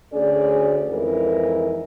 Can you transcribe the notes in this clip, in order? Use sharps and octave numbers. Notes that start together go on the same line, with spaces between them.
D2 C#4 G#4 D5
F2 G#2 E3 A#4